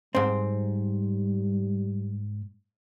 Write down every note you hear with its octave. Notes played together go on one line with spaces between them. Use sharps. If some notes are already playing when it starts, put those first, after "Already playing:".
G#2 G3 C4